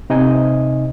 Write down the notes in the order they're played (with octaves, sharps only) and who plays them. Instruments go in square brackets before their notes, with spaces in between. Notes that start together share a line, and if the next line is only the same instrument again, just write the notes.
[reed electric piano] C3 D#4 D#5 G#5